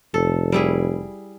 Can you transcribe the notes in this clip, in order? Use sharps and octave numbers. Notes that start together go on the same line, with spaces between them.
F1 A4
G3 E4 G#4